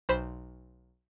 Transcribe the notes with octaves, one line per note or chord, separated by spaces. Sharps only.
B1 C5 B5 E7